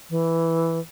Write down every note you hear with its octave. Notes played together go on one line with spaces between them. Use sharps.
E3